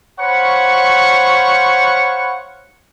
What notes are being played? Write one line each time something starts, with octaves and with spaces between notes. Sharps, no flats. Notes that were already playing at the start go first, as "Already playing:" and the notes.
C5 C#5 F5 F#5 B5 C#6